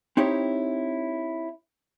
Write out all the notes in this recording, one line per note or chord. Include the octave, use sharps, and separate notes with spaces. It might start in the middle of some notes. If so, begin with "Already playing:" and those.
C4 D#4 E4 G4 C#5